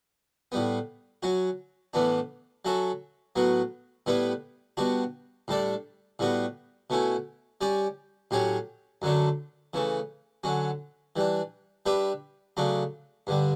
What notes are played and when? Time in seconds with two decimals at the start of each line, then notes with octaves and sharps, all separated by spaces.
0.52 A2 G3 B3
1.23 F#3 C#4 F#4
1.93 A2 E3 B3 D4
2.65 F#3 C#4 F#4 A4 E5
3.36 A2 F#3 B3 F#4
4.06 A2 G3 B3 E4 B4
4.77 B2 G3 D4 F#4
5.48 A2 G3 D4 A4 D5
6.19 A2 G3 B3 F#4
6.90 B2 A3 C#4 E4
7.61 G3 C#4 G4 D5
8.31 A2 F#3 C#4 G4 C#5
9.02 F#2 D3 F#3 A3 D4
9.73 C#3 E3 A3
10.44 D3 F#3 C#4
11.16 E3 G3 D4
11.86 G3 D4 G4 B4 E5
12.57 C#3 F#3 A3 D4
13.27 G2 D3 G3